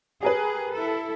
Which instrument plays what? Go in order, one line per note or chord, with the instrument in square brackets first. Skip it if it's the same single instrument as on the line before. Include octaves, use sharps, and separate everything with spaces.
[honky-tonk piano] G4 A#4 B4 [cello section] G#4
[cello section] E4 A4